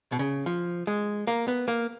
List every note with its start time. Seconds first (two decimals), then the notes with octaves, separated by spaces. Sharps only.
0.12 B2
0.19 C#3
0.46 F3
0.87 G#3
1.27 A#3
1.48 B3
1.68 A#3